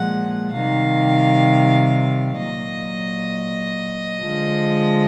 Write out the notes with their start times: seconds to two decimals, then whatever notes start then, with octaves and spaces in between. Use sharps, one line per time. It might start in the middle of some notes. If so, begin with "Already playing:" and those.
Already playing: A#2 F3 G#3 F#5
0.52 C3 D#3 G3 F5
2.37 A#2 F#3 D#5
4.22 D3 F3 G#3